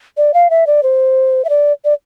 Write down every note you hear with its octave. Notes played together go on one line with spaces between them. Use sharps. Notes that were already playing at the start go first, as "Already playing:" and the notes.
D5
F5
E5
D5
C5
E5
D5
D5